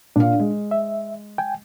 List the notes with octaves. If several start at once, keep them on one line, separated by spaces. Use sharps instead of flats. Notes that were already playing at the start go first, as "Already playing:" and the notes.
A#2 D4 F5
G#3
E5
G5 G#5